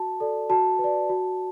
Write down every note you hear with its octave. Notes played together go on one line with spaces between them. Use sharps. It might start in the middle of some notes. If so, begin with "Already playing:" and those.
Already playing: F#4 A5
A4 D5
F#4 A5
B4
D5
F#4